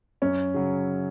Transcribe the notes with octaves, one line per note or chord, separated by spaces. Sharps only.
F#2 C#4
C#3 F#3